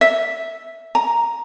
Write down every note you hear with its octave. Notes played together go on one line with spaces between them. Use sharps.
E5
A#5